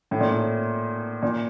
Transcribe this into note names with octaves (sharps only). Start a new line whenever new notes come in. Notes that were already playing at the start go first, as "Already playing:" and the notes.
A2
A#2
A2
A#2